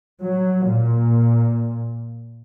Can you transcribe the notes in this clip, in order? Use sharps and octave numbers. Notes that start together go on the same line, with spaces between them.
F#3
A#2